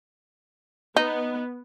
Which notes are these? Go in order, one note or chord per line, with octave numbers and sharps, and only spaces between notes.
B3 D#4